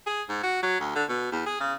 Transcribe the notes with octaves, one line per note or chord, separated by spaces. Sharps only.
G#4
G#2
F#4
F#3
D2
D3
B2
E2
G#4
C#3